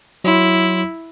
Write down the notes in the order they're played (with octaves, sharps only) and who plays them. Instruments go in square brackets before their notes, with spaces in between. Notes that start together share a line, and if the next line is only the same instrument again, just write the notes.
[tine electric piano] F#3 C6 [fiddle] E4